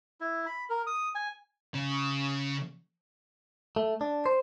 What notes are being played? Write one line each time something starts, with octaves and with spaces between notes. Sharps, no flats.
E4
B5
A#4
D#6
G#5
C#3
A3
D4
C5